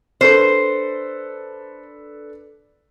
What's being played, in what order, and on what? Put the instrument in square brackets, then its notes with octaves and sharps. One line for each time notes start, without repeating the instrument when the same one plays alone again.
[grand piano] D4 A4 B4 [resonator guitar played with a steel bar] C5